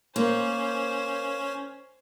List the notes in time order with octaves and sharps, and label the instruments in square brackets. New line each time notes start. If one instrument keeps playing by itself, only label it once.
[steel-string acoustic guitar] A#3 [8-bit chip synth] C#4 [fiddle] C5